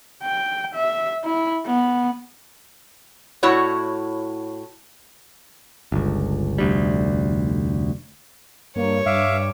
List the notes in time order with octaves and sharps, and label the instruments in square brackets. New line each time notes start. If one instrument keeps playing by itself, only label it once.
[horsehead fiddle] G5
E5
E4
B3
[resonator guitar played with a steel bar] A2 E4 F#4 C#5 F#5
[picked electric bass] G1 C#2
F1 D2 G3
[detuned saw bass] G2 [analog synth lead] A#3 [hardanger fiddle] C#5
[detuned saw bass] G2 [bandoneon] E5 F5 [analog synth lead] D6